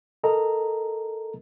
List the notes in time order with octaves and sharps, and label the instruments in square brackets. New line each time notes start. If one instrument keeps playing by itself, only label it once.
[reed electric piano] A4 A#4 D#5 A#5